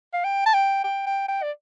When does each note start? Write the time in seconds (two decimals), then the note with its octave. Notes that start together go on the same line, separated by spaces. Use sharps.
0.13 F5
0.24 G5
0.46 A5
0.54 G5
0.84 G5
1.07 G5
1.28 G5
1.43 D5